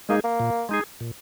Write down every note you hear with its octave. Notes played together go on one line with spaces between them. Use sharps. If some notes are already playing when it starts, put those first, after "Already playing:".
G#3 A#3 D#4 G#4
A#3
A#2
G#3 D#4 G#4
A#2